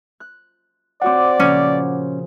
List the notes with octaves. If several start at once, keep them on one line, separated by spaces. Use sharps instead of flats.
F#6
C4 F#4 C#5 D5 F#5 D6
A#2 C#3 F3 C#4